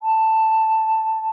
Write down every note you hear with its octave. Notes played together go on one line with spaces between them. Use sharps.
A5